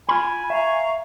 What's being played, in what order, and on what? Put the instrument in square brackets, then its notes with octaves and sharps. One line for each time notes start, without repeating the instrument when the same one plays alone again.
[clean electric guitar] F4 B5 [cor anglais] G#5
[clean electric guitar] E5 [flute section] F5 A#5 C#6